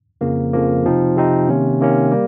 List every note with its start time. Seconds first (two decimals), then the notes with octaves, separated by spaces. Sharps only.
0.21 F2 C#3 F3 A#3
0.53 F2 C#3 F3 A#3
0.84 C3 F3 C4 D#4
1.16 C3 F3 C4 D#4
1.48 C3 D#3 A#3 C#4
1.81 C3 D#3 A#3 C#4
2.12 G3 A#3